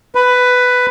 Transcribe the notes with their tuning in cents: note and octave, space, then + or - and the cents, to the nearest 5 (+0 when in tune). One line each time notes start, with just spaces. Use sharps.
B4 +10